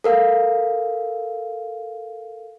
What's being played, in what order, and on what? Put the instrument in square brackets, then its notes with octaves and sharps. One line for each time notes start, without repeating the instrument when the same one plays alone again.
[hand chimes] A4 A#4 F5